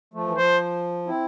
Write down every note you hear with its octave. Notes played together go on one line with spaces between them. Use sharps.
F3 A3
E3
F3 C5
C4 E4